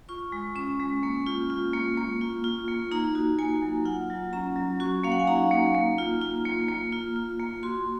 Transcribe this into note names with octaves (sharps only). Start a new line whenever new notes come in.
F4 C#6
G#3
C#4 C#6
G#3
A#3
F4
F4
A#3
A#3
F4
F4
A#3
D#4 A#5
F#4
A#3 G#5
F#3
F4 F#5
F#3
C#4 A#5
F#3
F#4 C#6
A#3 F5
F#5
G#5
D#4 A#5
A#3
A#3
F4
F4
A#3
A#3
F4
F4
A#3
F#4 C6